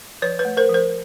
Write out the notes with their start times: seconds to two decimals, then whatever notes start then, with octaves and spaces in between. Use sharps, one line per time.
0.22 F3 B4 C#5
0.39 B4 C#5
0.45 A3
0.57 A#4 C5
0.69 F3
0.74 A#4 C5